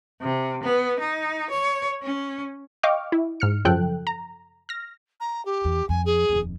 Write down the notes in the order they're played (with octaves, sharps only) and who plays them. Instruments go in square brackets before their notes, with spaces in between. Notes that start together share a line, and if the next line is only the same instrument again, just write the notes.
[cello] C3
B3
D#4
C#5
C#4
[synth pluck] D#5 F5 G5 C#6 D6 F6
E4
G#2 F6 C#7
F#2 C#3 F3 A4 G5 F#6
A#5
F6 A#6
[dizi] A#5
G4
[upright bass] E2
[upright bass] F2 [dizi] G#5
[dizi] G#4
[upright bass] D#1 F2